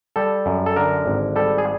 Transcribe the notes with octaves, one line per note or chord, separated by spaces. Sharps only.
G3 A4
F#2
A4
D3 A#4
G#1
G3 A4
G#4